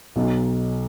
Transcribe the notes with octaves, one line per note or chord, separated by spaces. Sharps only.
B1 B2 F#3